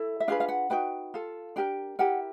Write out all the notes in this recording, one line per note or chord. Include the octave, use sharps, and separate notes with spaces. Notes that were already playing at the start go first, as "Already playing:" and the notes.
Already playing: E4 A4
E5
D4 F4 G#4 B4 F5
F5
F#5
D#4 F#4 B4 G5
F4 A4
D4 G4 A#4 G5
E4 G4 A#4 F#5